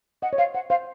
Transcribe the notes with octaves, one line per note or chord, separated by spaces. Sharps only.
D#5 F#5
C#5
C5 F5
C5 F#5
C5 F5